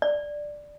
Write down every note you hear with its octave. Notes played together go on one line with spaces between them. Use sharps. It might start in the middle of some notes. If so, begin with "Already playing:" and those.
D5